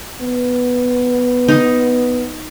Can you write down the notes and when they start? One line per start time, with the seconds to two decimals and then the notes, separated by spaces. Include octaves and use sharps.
0.22 B3
1.48 D#4